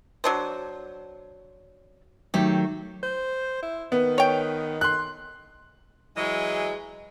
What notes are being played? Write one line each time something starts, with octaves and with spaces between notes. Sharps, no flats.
F#3 D4 C5
D#3 F#3 A3 G4
C5
E4
D#3 B3
C#5 G5
C6 F#6
E3 F#3 G#3